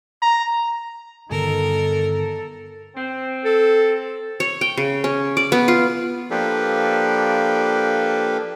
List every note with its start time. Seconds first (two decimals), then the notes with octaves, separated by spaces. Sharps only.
0.22 A#5
1.31 G2 D3 D#3 B3 A4 A#4
2.95 C4
3.45 A4
4.40 C#5
4.61 G5
4.77 C#3
5.04 C#4
5.37 D5
5.52 B3
5.68 F4
6.30 F3 A#3 D4 G4 A4 B4